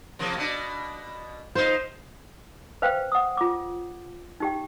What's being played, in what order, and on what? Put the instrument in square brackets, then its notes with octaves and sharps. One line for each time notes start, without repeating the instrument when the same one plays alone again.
[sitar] C3 F3 A#3
B2 D4
[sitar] D#4 F4 [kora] C5
[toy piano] B4 C5 F5 G5
F#5 D#6
F4 D6
D#4 G4 G5